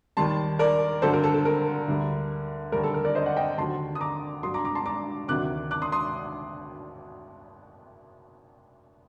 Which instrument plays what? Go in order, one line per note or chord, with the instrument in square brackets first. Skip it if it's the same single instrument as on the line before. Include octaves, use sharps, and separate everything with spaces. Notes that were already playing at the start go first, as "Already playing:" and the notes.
[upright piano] D#2 D#3 G3 A5 C6
A#4 D5
G2 D3 F#3 A4 C5
A#4
A4
A4
A#4
D2 D3 G3
D#2 D3 G3 A#4
A4
A#4
A#4 D5
C5 D#5
D5 F#5
D#5 G5
D#2 D3 F#3 A5 C6
D#6
A#5 D6
G2 F#3 C6 D#6
A#5 D6
A#5 D6
A5 C6
A#5 D6
D2 C3 D#3 F#3 D6 F#6
D6 F#6
C6 D#6
C6 D#6